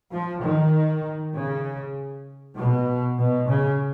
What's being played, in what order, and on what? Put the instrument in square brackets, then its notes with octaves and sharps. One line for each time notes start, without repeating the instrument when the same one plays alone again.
[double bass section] F3
D#3
C#3
B2
B2
C#3